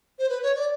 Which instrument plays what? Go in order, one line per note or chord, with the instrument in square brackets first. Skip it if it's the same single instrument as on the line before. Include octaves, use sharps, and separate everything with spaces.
[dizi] C5
B4
C#5
D5